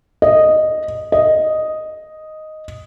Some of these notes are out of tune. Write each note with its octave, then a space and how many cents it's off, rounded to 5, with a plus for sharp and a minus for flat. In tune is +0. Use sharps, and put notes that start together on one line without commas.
D#5 -5
D#5 +0